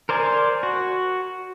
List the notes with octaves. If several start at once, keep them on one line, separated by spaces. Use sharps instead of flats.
A#4 C5 D5 G#5
F#4